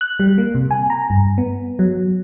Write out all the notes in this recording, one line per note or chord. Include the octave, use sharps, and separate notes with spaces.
F#6
G3
A#3
C3
G#5
A#5
G2
B3
F#3